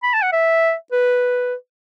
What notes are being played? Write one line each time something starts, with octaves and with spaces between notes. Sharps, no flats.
B5
A5
F#5
E5
B4